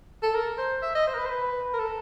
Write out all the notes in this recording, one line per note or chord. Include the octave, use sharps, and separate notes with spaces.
A4
A#4
C5
E5
D#5
C5
A#4
B4
C5
B4
A#4
A4